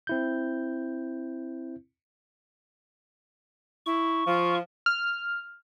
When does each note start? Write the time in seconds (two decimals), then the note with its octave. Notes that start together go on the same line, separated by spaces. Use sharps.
0.07 C4 E4 G6
3.86 E4 C#6
4.27 F3 F4
4.86 F6